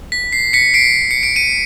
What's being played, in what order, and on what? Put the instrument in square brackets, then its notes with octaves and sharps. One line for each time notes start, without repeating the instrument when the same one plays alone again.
[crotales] B6
C7
B6 C#7
C7 D7
C#7
D7
C#7 D#7